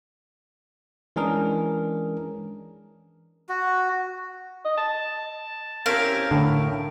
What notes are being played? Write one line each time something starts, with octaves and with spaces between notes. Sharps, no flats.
E3 G#3 C#4 D4 G#4 A#4
F#4
D#5
A5
C4 C#4 E4 G4 A#4 F5
A2 D3